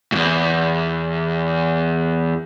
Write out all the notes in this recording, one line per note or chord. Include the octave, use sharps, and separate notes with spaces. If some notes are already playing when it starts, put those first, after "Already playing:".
E2 G#2